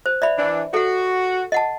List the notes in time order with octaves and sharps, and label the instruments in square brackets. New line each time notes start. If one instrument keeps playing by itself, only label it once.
[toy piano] C5
D5 E5 B5
[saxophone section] E3 D4
[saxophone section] F#4 [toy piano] A4 F#5
[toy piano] D#5 F#5 A5